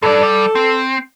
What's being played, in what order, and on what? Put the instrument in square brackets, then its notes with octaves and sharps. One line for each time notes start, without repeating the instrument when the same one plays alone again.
[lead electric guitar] G2 D5 [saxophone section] A4
[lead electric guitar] G3
C4